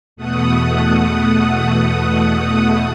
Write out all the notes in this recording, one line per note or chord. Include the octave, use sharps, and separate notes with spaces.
E2 B2 A3 F#5 D#6